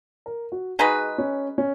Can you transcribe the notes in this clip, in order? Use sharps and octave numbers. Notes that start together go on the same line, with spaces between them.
A#4
F#4
G#3 D#4 F#4 G#4 B4
C#4
C#4